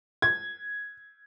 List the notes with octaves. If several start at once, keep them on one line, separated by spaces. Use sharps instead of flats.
G#6